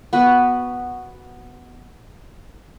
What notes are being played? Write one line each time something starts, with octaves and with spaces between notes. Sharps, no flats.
B3 F#4 B4